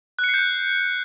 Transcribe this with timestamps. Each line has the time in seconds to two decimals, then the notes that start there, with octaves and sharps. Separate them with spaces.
0.19 F#6
0.24 C#7
0.29 C7
0.34 G6
0.39 F#6